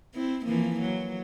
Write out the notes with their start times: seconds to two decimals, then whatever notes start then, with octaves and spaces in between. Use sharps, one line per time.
0.14 C4 E4
0.46 E3 F3 A#3
0.80 F#3